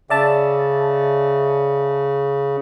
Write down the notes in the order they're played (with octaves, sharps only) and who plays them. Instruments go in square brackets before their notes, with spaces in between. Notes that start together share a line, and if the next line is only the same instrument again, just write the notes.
[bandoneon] C#3 [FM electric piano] D5 E5 A5